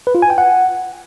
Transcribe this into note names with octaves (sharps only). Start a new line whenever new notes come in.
B4
F4
G#5
G5
F#5